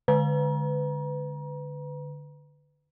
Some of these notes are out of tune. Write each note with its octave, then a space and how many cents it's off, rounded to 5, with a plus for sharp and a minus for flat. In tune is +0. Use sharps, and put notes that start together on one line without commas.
D3 +0 B4 +20 A#5 +35